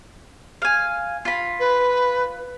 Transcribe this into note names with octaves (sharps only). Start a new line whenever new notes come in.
F5 G#5
F4 B5
B4